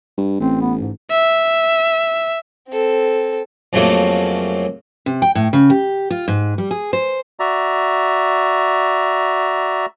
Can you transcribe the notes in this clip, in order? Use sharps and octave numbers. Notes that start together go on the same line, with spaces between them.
G2
A1 C4
B3
G#2
E5
C4 A4
F2 C#3 F#3 A3 A#3
C3
G5
A2
C#3
G4
F4
G#2
G3
G#4
C5
F#4 D5 E5 A#5